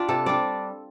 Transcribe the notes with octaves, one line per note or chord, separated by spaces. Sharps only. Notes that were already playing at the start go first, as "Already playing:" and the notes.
Already playing: D4 F4 G4 D5
C3 A4
G3 D4 D5